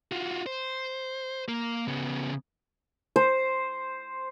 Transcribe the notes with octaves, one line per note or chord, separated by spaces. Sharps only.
F4 F#4
C5
A#3 A#4
C#3 B3
C5